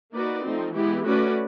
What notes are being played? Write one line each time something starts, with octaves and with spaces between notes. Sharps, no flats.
A#3 D#4 F#4 B4 D5
F3 A3 C4 D#4
E3 G#3 B3 E4 G4
A3 C#4 F#4 B4 D5